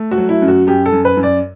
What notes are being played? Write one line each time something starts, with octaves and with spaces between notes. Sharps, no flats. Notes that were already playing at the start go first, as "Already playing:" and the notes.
Already playing: A3
F#4
F#3
E4
F#2
F#4
F#2 G4
A4
F#2
B4
F#2
D5